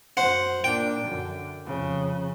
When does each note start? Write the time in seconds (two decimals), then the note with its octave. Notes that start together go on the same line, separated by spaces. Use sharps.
0.17 F#2 C5 F#5
0.64 A#2 D4 G5
1.05 F#2 D3
1.65 F2 C#3